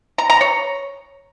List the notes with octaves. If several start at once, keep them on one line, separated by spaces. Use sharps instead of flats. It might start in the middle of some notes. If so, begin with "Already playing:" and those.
A#5
A#5
C#5